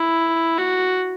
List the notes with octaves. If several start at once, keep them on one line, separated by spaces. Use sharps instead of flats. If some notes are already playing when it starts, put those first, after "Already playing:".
Already playing: E4
F#4